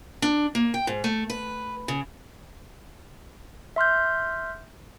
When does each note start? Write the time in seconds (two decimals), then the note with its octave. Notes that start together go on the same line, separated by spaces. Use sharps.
0.22 D4
0.55 A#3
0.74 G5
0.87 G#2
1.04 A3
1.30 B4
1.88 C#3
3.76 E5 C6 F6 G6